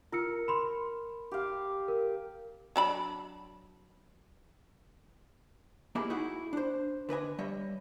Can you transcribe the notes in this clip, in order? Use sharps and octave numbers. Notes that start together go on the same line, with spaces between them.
F4 A#4 E6 C#7
B5 C6
G4 F5
A#4
F#3 D4 B5
A#3 E4 G4 G#4 D#5 E5
D#4 E4 F#4 G#4 E5 F#5
D4 C5
D3 B4 D#5 G#5
G3 C#5 D#5 E5